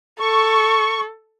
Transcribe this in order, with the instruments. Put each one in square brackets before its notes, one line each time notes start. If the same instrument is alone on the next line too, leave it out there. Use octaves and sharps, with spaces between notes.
[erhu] A4 [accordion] C#6